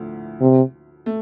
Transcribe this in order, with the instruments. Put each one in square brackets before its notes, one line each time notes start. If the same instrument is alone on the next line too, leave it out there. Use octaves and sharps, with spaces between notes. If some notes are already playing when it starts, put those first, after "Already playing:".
Already playing: [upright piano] D2 A2 D3 F3
[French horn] C3
[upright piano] A3